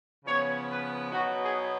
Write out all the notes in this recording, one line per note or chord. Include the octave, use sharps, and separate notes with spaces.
C#3 F3 B3 C#5
B4
B2 F#3 B3 D#4 F#4
G#4